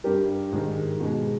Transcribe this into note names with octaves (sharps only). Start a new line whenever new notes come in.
G2 G3 G4 A#4
G#2 D#3 G#3
B2 G#3